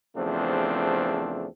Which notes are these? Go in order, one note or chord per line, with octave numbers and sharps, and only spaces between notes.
E2 C#3 F3 A3 C4 D4